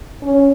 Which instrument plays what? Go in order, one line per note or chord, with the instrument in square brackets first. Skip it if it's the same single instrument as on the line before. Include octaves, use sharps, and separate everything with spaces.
[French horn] C#4